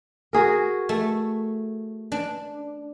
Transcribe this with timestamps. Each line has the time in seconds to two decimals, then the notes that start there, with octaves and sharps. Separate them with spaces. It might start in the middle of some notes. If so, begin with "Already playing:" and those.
0.33 F#4 G#4 A#4
0.89 A3
2.12 D4